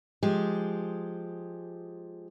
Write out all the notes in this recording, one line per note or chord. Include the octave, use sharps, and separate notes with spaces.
F3 G#3 G4